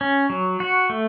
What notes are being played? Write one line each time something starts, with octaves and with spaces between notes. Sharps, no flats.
C#4
F#3
F#4
A3